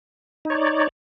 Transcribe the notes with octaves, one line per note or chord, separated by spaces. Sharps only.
D#4 C#5 D5